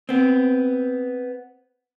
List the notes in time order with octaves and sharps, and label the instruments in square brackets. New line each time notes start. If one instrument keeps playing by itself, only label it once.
[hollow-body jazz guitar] B3 C4